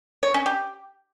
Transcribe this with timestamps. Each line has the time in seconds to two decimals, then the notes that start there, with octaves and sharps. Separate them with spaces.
0.23 C#5
0.34 C#4
0.46 G4